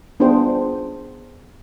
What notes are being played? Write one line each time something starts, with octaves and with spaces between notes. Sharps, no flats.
B3 D4 F4 G#4 C5 G5